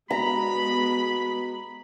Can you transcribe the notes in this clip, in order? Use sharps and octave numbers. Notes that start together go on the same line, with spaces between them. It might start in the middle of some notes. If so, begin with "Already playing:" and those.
B2 G#3 B3 A#5 B5